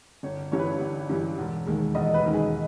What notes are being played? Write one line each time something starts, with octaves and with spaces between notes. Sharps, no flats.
G1 C#5
G2 E3 G3 C#5
B4
C#5
G1
G2 E3 G3
E1
D#2 D#3 G#3
E1 D#5
B4
D#2 D#3 G#3
G#4